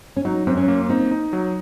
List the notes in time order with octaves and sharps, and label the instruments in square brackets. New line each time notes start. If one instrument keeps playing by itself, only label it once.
[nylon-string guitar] C#4
[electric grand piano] F#3 [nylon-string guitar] D#4
[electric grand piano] F#2 [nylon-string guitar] C4
[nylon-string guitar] C#4
[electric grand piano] A#3
[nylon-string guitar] C4 [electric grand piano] D#4
[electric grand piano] D#4
F#3